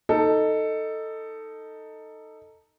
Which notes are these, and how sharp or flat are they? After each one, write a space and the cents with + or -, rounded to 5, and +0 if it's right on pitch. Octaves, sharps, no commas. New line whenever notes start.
D#4 +0 A4 +10